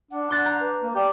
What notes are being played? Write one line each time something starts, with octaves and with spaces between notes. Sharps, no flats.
D4 F#5
D4 C6 F#6 A6
A#5 G6
B4
A#3
G4 D5